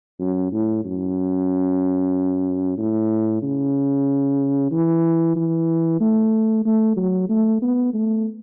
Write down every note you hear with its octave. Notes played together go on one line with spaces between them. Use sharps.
F#2
A2
F#2
A2
C#3
E3
E3
A3
A3
F#3
A3
B3
A3